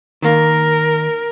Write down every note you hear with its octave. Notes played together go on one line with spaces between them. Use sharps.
D#3 A#3 A#4